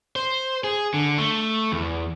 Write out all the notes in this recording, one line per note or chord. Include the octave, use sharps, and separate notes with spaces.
C5
G#4
D3
A3
E2